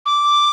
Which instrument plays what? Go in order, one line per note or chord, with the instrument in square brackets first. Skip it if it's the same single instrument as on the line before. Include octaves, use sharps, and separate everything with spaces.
[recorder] D6